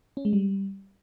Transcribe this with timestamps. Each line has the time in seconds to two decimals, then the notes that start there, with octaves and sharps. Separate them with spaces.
0.17 C#4
0.25 G#3
0.33 G3